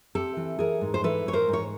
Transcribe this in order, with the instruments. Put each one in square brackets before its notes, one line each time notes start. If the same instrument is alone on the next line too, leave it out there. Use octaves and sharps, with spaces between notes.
[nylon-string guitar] C4 G4 A4
E3
E3 G#4 A#4
G#2
C5
E3 A4 B4
G#2 C#5
A#4 C5
G#2
C#5